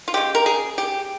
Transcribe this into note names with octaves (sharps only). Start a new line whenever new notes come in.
F4
C#3 G#3 G4
A#4
G#4
G4